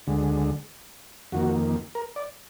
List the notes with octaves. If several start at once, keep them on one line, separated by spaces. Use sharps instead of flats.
D2 D3 G#3
F2 D#3 A#3 F#4
A#4
D5